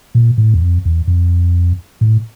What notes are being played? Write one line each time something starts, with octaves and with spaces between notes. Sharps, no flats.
A#2
A2
E2
F2
E2
F2
A2